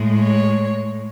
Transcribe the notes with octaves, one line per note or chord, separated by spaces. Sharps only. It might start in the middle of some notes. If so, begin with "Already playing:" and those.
Already playing: A2 G#3
C#5